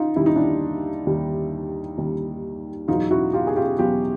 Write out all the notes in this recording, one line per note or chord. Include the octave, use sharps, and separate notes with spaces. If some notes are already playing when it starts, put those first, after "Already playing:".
Already playing: D#3 D#4 F4
D#2 D#3 G3 E4
D#4
D4 E4
D#2 D#3 G3
D#2 D#3 G3
E2 B2 F#3 D#4 F4
E4 F#4
F4 G4
G#4
F4 G4
E2 B2 F#3 F4 G4